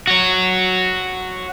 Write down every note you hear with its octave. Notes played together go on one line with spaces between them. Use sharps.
F#4 C#5